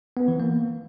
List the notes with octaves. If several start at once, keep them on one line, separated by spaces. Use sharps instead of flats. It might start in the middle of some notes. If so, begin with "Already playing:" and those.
B3
E3
A#3